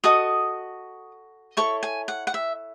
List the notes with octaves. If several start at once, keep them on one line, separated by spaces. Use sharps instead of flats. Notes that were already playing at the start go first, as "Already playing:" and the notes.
F#4 A4 D#5 D#6
E4 A4 C#5 C#6
G#5
F#5
F#5
E5